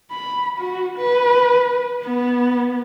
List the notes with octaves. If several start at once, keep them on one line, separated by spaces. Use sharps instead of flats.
B5
F#4
B4
B3